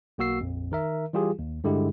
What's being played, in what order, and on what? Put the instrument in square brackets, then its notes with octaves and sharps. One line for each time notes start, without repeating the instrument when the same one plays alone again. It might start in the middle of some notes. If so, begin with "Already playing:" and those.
[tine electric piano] B1 A#3 F#4 E6 C7
A#1 F2
D#3 A#4 E5
E3 G3 F4 G4 G#4
D#2
G2 D3 G#3 E4 G4